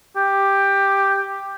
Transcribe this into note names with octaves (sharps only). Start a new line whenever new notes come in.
G4